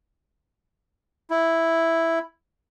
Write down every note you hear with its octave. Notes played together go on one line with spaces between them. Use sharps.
E4